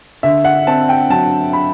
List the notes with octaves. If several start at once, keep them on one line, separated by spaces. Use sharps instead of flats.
D3 E5
F#5
C4 A5
G5
F#3 A5
B5